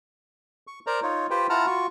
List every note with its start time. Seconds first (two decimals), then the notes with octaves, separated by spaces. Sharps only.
0.67 C#6
0.87 A#4 C5 D5 A#5
1.03 D#4 F4 C#5
1.30 F4 G4 B4 C5 G5
1.50 E4 F4 F#5 A5 A#5 F6
1.66 F4 F#4 C#6